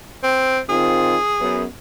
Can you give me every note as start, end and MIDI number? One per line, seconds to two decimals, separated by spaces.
0.23 0.60 60
0.69 1.17 51
0.69 1.17 60
0.69 1.17 65
0.69 1.63 68
1.40 1.65 42
1.40 1.65 59